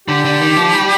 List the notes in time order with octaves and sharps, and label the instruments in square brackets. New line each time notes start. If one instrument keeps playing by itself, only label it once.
[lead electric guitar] D3 [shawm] G4
[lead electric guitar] D3
D#3
F3
G3